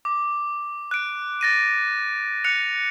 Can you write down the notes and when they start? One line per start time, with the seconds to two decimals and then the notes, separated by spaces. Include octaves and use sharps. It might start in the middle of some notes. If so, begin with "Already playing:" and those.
0.05 D6
0.91 F#6 D7
1.41 A6 A#6 D#7
2.44 F#6 C#7 F7